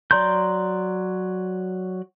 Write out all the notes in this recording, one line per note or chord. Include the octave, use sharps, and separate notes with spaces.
F#3 D5 A#5 C6 G6